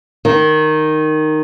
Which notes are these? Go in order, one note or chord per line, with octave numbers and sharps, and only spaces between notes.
D#3